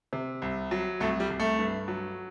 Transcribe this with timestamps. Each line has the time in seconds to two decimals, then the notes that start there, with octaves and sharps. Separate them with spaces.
0.13 C3
0.42 C2
0.71 F#3
1.00 C2 A3
1.20 G3
1.30 C2
1.40 A3
1.59 G2
1.88 F#3